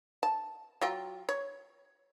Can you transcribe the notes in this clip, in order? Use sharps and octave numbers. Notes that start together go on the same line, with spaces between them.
A5
F#3 F4 G5
C#5